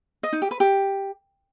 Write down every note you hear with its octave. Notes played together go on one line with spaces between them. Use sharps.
D#5
D#4
G4
B4
G4